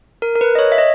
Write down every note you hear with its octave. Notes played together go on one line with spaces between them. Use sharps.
A#4
A#4
B4
D#5
C#5
E5
D#5